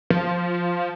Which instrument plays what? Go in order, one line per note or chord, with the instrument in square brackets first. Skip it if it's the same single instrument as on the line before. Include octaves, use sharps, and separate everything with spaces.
[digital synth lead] F3